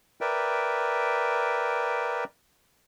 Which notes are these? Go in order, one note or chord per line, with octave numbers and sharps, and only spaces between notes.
A#4 B4 D5 E5 G5